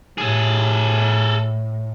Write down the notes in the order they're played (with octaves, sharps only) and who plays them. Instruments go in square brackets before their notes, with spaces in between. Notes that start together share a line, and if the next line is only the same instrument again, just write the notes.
[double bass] A2 [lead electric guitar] G#4 A4